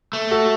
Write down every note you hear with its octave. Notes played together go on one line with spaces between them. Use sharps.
A3
F#4 A4